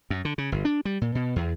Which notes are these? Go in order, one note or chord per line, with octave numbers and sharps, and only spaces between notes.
F#2
D3
C#3
G1
D4
G3
A#2
B2
E2